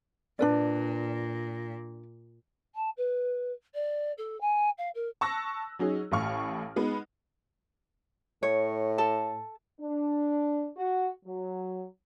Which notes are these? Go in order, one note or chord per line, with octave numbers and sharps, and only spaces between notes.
A#2 D4 B4 D5
A5
B4
D5
A4
G#5
F5
A#4
A5 C#6 E6 F#6 A#6
F#3 C#4 D#4 G#4
A1 A2 F5 C#6 F6
G#3 B3 D#4
A2 C#5
A4 A5
D4
F#4
F#3